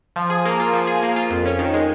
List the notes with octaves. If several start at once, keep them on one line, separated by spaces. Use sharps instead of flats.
F3
G#4
A#3
F4
F3
G#4
A#3
F4
F2
C#4
D#3
G#3